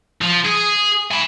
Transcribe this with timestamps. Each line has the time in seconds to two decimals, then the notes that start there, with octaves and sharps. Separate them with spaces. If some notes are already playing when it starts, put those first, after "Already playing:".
0.21 F3
0.45 G#4
1.12 G#5 B5